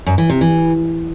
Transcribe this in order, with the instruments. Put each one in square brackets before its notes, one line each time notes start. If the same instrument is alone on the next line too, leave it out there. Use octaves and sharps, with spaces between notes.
[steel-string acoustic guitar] F#2
E3
C3
E3